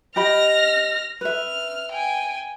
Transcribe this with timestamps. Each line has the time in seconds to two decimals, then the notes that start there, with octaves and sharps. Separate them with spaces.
0.16 G4 D#5 B5 F6 A#6
1.21 B4 E5 F6
1.92 G5 G#5